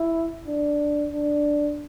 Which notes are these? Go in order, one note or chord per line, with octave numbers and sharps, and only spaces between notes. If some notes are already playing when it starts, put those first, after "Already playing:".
Already playing: E4
D4
D4